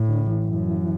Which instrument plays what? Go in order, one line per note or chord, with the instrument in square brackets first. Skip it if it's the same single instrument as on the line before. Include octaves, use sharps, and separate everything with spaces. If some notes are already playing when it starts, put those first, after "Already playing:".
Already playing: [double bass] A2
[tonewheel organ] D3
E3
[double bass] F#2